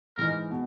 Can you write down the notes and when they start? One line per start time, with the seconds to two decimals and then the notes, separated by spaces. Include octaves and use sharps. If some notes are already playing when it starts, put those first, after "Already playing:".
0.17 G#2 E3 G#3 D#4 A#4
0.51 B2